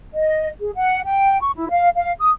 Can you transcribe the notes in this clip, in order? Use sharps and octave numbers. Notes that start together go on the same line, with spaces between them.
D#5
G#4
F#5
G5
C#6
E4
F5
F5
D#6